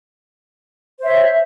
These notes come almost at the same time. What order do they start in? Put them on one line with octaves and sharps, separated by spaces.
C5 E5 C#5